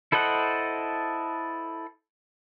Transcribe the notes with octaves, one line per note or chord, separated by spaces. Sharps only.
E4 A4 C5 D#5 F#5